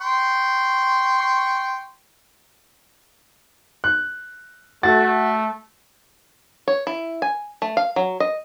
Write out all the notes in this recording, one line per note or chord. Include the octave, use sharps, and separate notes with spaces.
G5 C6 C#6
F#6
A3 F#4 A6
C#5
E4
G#5
A3
F5
F#3
D#5